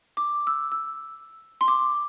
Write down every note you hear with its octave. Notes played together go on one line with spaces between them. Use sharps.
D6
E6
E6
C6
D6